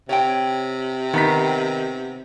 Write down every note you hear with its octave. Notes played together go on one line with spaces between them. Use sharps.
C3 C#5 G5
D#3 B3 A#5 B6